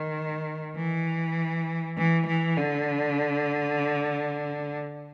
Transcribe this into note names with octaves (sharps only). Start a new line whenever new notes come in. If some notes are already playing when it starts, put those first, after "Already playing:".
Already playing: D#3
E3
E3
E3
D3